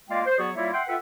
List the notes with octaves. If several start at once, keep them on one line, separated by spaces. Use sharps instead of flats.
G#3 A#3 F4 D5 F5 G5
C5
F#3 B3 F#4 G#4 C#5 D5
G3 A#3 E4 F4 C#5 E5
E5 F#5 G5 C6
F4 A4 B4 E5 F#5 G5